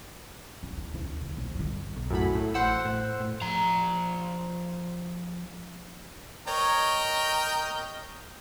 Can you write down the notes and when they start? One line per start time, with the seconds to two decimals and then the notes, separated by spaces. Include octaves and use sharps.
0.63 C#3
0.77 D#2
0.94 D#2 C#3
1.21 D3
1.37 A#1 F3
1.55 G2 D3
1.96 B1
2.10 F#2 A2 B5
2.35 A2
2.54 A1 C5 F#5 E6
2.85 A2
3.20 A2
3.42 F3 A#5
6.47 A#4 C#5 D#5 G5